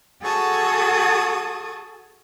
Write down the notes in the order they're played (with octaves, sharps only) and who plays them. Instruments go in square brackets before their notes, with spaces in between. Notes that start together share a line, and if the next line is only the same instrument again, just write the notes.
[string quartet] F#4 G#4 A4 A5 C#6 D#6